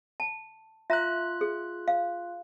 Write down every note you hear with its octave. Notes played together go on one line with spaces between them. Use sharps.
A5
F4 E5 A#5 F#6
G#4
F5